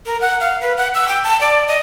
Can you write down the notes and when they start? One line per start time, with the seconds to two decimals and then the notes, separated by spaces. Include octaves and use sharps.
0.06 A#4
0.21 F#5
0.40 F5
0.61 B4
0.77 F#5
0.94 E6
1.08 G5
1.24 A5
1.41 D5
1.68 D#5